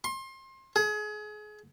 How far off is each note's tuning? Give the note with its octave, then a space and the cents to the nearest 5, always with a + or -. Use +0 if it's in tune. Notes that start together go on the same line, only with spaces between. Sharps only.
C6 +30
G#4 +30